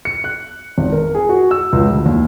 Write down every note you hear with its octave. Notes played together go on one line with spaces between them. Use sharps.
C#7
F#6
G#1
A#4
G#4
F#4
E6
C#2
D2
D#2